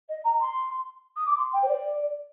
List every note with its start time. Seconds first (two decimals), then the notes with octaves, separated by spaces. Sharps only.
0.08 D#5
0.24 A#5
0.40 C6
1.16 D#6
1.26 D6
1.37 C6
1.53 G5
1.62 C5
1.68 D5